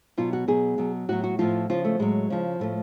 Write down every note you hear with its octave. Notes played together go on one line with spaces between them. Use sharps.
B2 F#3 F4
F#4
B2 F#3 G#4
B2 F#3
A2 F#3 F#4
F#4
A2 F3 F4
C#3 F3 F4
A3
A2 F#3 G#3
C#3 F3
A2 F3 A3